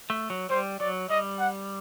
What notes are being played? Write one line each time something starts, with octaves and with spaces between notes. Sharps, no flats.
A3
F#3
G3 C5
F#3 D5
G3 D#5
F#5